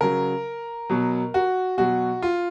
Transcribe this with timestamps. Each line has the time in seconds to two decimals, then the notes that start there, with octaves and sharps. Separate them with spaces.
0.01 C#3 F#3 A#4
0.90 B2 F#3
1.34 F#4
1.77 B2 F#3 F#4
2.22 F4